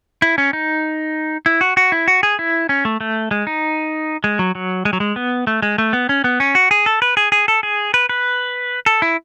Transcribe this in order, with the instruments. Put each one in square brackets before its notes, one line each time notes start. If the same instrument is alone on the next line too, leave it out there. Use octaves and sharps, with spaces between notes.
[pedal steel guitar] E4
C#4
D#4
E4
F#4
F#4
E4
F#4
G#4
E4
C#4
A3
A3
G#3
D#4
G#3
F#3
F#3
G#3
F#3
G#3
B3
A3
G#3
A3
B3
C#4
B3
C#4
F#4
G#4
A4
B4
G#4
G#4
A4
G#4
B4
B4
A4
E4